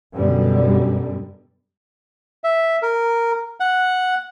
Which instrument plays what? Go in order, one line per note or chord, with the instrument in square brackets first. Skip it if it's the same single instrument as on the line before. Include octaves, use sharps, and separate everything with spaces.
[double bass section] F#2 B2 D3 G3
[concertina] E5
A#4
F#5